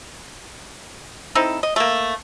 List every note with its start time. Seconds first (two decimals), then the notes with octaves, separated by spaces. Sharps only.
1.35 C4 D#4 E4 A4
1.63 D#5
1.76 A3 A#3